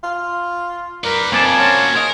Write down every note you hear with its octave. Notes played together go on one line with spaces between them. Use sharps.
F4
A#4 B4 D5
F2 A#3 C4 D5 G#5 A5
C#4 F#4 C5
D#4 G#4 A#4